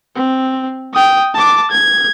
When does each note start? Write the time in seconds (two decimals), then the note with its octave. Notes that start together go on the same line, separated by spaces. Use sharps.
0.16 C4
0.93 G5 D#6
1.34 A5 D6
1.71 G#6